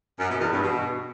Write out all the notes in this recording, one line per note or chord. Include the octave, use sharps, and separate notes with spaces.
F#2
B2
E2
G2
B2